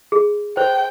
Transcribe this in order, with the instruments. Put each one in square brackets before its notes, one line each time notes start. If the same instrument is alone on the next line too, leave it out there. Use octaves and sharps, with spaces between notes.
[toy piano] G#4
[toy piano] C5 [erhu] G5